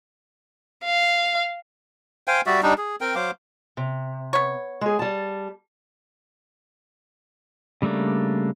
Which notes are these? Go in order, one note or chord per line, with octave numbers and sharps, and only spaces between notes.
F5
C5 F5 G5 G#5
G3 F#4 D5 E5
G3 D4 D#4
G#4
C4 A#4 G5
F#3 C5 F5 D6
C3
B3 C#5
G#3 G#4
G3 A5
C#3 G3 A3 A#3 D4